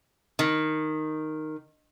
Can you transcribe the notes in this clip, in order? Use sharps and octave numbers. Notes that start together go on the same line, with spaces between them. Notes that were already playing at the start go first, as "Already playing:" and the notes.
D#3